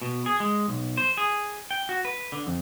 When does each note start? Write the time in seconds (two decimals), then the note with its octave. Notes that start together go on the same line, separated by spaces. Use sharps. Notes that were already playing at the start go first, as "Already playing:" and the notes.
0.02 B2
0.26 G#4
0.40 G#3
0.68 B1
0.97 C5
1.17 G#4
1.71 G5
1.89 F#4
2.05 B4
2.32 D3
2.47 F2